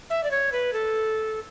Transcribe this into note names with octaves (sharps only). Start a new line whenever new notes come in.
E5
D5
C#5
B4
A4